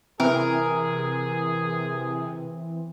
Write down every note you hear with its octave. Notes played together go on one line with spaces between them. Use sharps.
C3 E3 C4 G#4 A#4